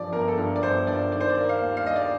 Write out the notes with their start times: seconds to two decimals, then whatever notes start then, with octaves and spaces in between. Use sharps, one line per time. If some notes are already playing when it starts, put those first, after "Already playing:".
Already playing: G2 F3 D5
0.12 G1 A#4
0.28 A4
0.37 G2 A#4
0.56 D5
0.62 G1 C5
0.87 G2 D5
1.12 D#3 D5
1.21 C5
1.29 D5
1.37 A#3
1.49 F5
1.62 D#2
1.77 F5
1.86 A#3 D#5
1.96 D5